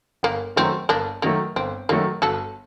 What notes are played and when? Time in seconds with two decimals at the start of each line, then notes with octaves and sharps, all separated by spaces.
0.23 G1 A#3
0.56 F#2 D#3 F#3 A3 C4
0.89 G1 A#3 D4
1.22 F#2 D#3 F#3 A3 A#3
1.56 G1 C4
1.89 F#2 D#3 F#3 A3 A#3
2.22 G1 F#4 A4